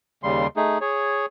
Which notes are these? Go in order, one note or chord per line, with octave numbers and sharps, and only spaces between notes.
D#2 C#3 G3 C6
A3 D#4 G#4
G#4 C#5